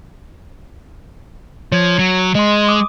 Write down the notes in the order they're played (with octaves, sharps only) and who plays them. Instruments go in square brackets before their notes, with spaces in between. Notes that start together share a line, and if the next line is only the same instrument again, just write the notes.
[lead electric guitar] F3 [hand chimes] C#5 G#6
[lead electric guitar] F#3
[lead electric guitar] G#3 [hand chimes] D#5 C6
[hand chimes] D6 D#6